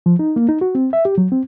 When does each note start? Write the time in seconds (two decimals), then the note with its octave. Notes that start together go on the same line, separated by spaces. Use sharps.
0.06 F3
0.19 D#4
0.36 A#3
0.49 D#4
0.61 F#4
0.75 C4
0.93 E5
1.05 G4
1.18 F#3
1.32 C4